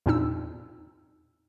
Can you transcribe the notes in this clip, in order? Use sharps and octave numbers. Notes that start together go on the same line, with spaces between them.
E2 A#2 C4 D4 D#4 E6